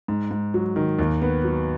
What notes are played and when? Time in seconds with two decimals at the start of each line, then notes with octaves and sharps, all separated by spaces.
0.08 G#2
0.31 G#2
0.54 F#3
0.76 D#3
0.99 D#2
1.21 B3
1.44 F#3